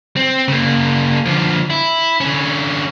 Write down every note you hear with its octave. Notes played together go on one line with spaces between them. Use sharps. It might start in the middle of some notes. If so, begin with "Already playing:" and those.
C4
C#3 A#3
D3 F3
E4
D3 C#4